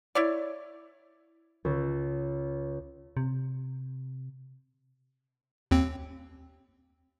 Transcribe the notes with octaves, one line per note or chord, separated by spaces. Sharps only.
E4 C#5 D5 G#6
C#2
C3
D#2 C4